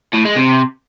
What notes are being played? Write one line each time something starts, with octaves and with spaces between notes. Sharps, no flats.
A2
G#3
C3